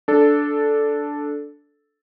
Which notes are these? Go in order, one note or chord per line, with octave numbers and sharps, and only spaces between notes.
D4 A4